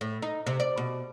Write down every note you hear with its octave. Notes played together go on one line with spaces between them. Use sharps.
A2
D#4
C3
D5
B2